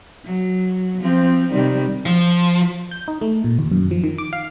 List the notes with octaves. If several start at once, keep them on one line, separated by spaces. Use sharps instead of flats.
F#3
F3 C4
C3 D#3 G3
F3
G6
D#4
A3
A#2
D#2
F#2
F3
D#3
D6
F5